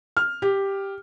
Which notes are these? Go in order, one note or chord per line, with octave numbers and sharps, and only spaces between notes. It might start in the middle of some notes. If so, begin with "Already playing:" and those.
F6
G4